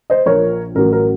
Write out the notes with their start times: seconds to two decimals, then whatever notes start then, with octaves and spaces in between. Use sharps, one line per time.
0.10 C5 D#5
0.26 A#1 A#2 F3 A#4 C#5
0.75 A1 A2 F#3 A#4
0.93 A#4